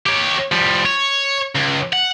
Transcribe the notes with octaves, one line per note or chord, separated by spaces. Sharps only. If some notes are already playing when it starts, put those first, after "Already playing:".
G4 C#5
F3 G3
C#5
C#2
F#5